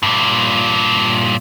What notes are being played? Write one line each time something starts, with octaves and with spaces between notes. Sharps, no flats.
G2 A#2